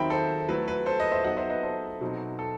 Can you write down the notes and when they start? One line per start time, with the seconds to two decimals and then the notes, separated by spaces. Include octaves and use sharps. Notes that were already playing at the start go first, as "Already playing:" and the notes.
Already playing: D#3 F#3 C4 D#4 E5 G5 B5
0.10 A4 C5
0.48 F#3 A3 E4 B4
0.68 B4
0.86 A4 C5
0.99 B4 D#5
1.12 C5 E5
1.24 F#3 B3 D#4 D#5 F#5
1.37 C5 E5
1.50 B4 D#5
1.63 A4 C5
2.01 B2 F#3 C4 D#4
2.39 A4